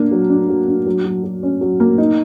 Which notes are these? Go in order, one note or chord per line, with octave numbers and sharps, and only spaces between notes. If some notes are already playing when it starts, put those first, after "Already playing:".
Already playing: A#3 D4
F#3
D4
F#3
D4
F#3
F#3
F#3
C#4
F#3
A#3
D#4